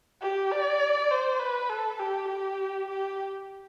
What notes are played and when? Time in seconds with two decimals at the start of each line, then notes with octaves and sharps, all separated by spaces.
0.22 G4
0.51 D5
1.11 C5
1.40 B4
1.69 A4
1.99 G4
2.28 G4
2.88 G4